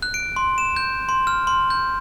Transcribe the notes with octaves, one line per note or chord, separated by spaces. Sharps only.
F#6
D7
C6
E7
G6
C6
F6
C6
G6